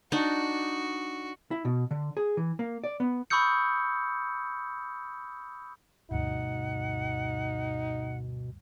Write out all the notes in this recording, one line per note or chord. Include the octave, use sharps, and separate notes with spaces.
D4 D#4 F#4
E4
B2
D3
G#4
E3
A#3
D5
B3
B5 C#6 D#6 E6 G6 C#7
D2 G2 B2 D#4 F#5